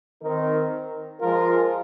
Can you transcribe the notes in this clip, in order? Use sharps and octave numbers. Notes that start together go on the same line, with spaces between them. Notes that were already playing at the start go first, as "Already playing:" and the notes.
D#3 C4 D#4 A#4
F3 G#3 F4 A#4